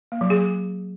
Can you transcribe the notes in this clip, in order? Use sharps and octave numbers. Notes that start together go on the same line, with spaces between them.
A#3
F#3
G#4